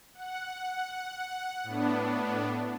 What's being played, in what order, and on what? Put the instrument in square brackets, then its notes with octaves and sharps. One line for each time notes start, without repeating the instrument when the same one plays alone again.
[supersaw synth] F#5
A2 B3 D4